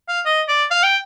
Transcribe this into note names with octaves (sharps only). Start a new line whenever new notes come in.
F5
D#5
D5
F5
G5